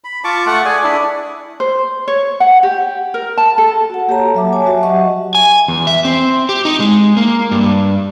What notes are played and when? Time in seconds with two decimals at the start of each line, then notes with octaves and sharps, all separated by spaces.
0.04 B5
0.24 F4 A5 C#6 D6
0.47 A3 F#5 C#6
0.65 G#4 D5 G#5
0.84 D4 E4
1.60 C5
2.08 C#5
2.40 F#5
2.63 G4
3.14 A#4
3.38 A5
3.58 A4
3.90 F#4 F#5
4.08 A#3 G4 A4 C#5 A5 A#5
4.35 F#3 E5 D6
4.53 C#5 G#5 A5
4.67 F#4 E5
4.83 F#3 G4 D#5 E5 F#5 C#6
5.35 G#5
5.68 E2
5.87 E5
6.05 C4
6.49 G4
6.65 D#4
6.80 G#3
7.17 A#3
7.51 G2